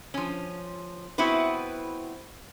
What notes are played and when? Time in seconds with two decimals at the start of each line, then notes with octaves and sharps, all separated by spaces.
0.14 F3 C#4
1.18 B3 C4 E4 F#4 B4